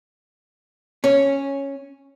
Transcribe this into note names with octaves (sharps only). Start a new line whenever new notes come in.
C#4